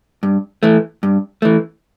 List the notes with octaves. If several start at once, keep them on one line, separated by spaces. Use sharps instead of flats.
G2
E3 A3
G2
E3 A3